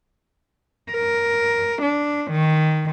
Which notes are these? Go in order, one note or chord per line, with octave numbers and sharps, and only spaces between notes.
A#4
D4
D#3